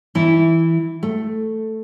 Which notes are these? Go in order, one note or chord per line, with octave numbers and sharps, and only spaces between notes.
E3 E4
A3